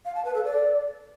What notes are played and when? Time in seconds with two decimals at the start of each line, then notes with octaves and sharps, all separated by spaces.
0.05 F5
0.15 A5
0.25 B4
0.34 A4
0.44 D5